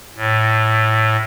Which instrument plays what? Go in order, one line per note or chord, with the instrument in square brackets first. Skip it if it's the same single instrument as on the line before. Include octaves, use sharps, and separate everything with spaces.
[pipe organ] A2